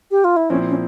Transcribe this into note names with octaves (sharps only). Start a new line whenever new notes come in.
G4
F4
E4
A#2 F3 C4 C#4 E4
C#4